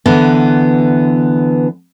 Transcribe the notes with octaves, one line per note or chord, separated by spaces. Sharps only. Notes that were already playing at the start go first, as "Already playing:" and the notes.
D3 E3 B3